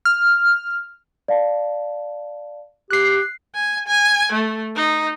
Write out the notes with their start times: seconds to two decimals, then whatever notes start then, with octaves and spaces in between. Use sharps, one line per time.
0.05 F6
1.28 D5 F5 A5
2.91 G4 F#6 C7
3.55 G#5
3.88 G#5
4.32 A3
4.76 D#4